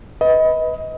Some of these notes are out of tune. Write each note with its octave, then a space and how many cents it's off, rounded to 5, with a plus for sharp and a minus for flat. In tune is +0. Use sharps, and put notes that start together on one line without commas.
B4 +0 D#5 +30